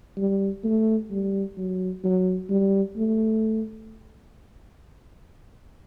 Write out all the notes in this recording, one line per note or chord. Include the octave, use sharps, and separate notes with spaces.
G3
A3
G3
F#3
F#3
G3
A3